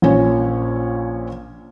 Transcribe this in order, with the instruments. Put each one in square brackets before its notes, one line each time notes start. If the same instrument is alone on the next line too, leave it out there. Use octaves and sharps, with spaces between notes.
[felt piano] A#1 A#2 C#4 C#5